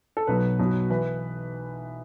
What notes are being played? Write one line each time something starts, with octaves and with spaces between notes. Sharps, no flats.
A4
B1 B2 F#3 B4
B1 B2 F#3
E3 B4